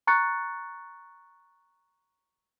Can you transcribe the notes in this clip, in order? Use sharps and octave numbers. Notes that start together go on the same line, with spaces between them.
A#5 C#6 F#6 A6 C#7